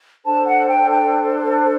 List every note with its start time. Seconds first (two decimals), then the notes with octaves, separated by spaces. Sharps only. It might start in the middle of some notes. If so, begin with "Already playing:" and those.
0.24 D4 A4 C5 A5
0.46 F#5
0.68 G5
0.89 G5